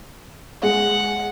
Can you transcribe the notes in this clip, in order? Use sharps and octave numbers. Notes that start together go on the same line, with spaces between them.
G#3 F#5